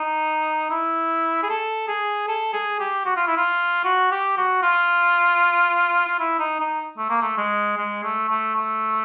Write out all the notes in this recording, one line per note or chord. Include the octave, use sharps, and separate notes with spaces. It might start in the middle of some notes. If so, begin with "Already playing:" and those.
Already playing: D#4
E4
G#4
A4
G#4
A4
G#4
G4
F#4
F4
E4
F4
F#4
G4
F#4
F4
F4
E4
D#4
D#4
A3
A#3
A3
G#3
G#3
A3
A3
A3